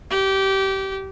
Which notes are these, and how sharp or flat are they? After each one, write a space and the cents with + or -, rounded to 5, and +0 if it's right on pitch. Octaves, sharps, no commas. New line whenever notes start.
G4 -20